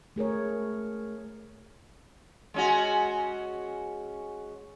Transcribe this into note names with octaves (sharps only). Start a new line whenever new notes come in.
A3 G#4 A#4 C#5
G#3 C#4 F#4